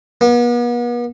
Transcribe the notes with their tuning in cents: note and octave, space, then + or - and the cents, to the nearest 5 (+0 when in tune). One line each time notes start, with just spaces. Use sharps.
B3 -40